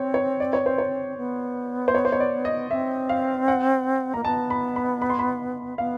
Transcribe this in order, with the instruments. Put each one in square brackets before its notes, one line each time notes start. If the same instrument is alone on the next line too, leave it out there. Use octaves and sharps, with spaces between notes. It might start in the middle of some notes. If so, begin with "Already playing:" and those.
Already playing: [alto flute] C4 [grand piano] C5 C#5
[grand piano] C#5
D5
C#5
C5
C#5
[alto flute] B3
[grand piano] C5
C#5
C5
C#5
D5
D#5
[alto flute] C4 [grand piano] E5
[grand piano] F5
F#5
[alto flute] A#3 [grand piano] A#5
[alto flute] B3 [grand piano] A5
[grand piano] B5
B5
B5
C6
B5
[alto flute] B3 [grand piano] F5